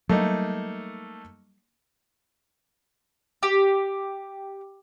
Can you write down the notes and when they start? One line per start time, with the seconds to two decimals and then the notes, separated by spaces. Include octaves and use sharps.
0.09 F#3 G3 A3 A#3 D#4
3.43 G4